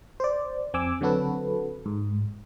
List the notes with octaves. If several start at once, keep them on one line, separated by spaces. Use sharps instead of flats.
C5 D5
F2 C4 G#5 D6 E6
D3 F#3 C4 F#4 A4 B4
G#2